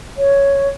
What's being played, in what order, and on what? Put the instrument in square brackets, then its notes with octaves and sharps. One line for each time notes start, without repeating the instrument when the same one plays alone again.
[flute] C#5